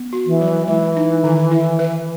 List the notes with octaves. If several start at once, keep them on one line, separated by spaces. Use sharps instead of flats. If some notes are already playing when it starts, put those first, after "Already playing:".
Already playing: B3
F#4
E3
F#3
E3 G#3
D#4
D#3
E4
B4